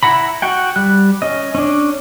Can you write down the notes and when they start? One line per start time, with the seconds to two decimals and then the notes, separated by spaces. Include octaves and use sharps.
0.03 E4 F#5 A#5 B5
0.42 F#4 F#5 G5
0.76 G3 F#6
1.22 C#4 D#5
1.55 C#4 D4